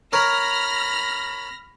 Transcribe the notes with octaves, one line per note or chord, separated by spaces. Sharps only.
A#4 C#5 B5 F6 A#6